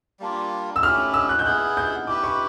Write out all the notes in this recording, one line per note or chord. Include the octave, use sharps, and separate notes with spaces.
G3 A#3 D4 F4
E6
A3 C#4 E4 G4 F6
E6
F#6
G6
B3 E4 G#4 F#6
G6
E4 G4 B4 D6
C#6